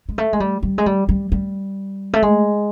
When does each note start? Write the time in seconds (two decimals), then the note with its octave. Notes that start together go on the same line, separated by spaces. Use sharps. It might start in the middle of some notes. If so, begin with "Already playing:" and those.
0.09 G#3
0.18 A3
0.33 G#3
0.40 G3
0.63 G3
0.78 G#3
0.86 G3
1.09 G3
1.32 G3
2.13 A3
2.22 G#3